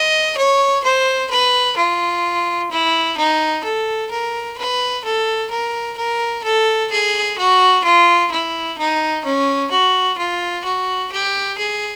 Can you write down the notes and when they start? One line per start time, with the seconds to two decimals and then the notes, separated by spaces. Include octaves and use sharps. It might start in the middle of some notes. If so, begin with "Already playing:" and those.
Already playing: D#5
0.37 C#5
0.84 C5
1.30 B4
1.77 F4
2.71 E4
3.18 D#4
3.64 A4
4.11 A#4
4.58 B4
5.04 A4
5.51 A#4
5.97 A#4
6.44 A4
6.91 G#4
7.38 F#4
7.84 F4
8.31 E4
8.78 D#4
9.25 C#4
9.71 F#4
10.17 F4
10.64 F#4
11.12 G4
11.58 G#4